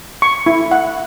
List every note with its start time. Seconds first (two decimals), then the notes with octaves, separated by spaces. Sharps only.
0.22 C#6
0.46 E4
0.71 F#5